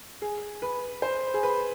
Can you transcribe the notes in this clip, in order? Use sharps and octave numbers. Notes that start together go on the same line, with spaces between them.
G#4
B4
C5
G#4
B4